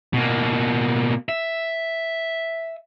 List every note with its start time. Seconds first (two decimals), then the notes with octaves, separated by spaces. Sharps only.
0.13 B2 A#3
1.29 E5